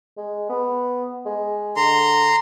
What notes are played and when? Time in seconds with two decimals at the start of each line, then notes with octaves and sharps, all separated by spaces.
0.17 G#3
0.49 B3
1.26 G#3
1.76 D3 A#5 C6